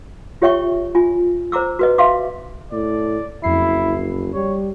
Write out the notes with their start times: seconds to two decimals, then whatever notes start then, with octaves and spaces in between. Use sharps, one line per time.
0.42 F4 G4 C#5 E5 G5 C#6
0.95 F4 G#5
1.52 C5 A#5 D6 E6
1.79 F#4 B4 D#5
1.98 E5 F5 C6 D6
2.72 A2 D5
3.43 F#1 F2 E4 C7
4.34 G3 C#5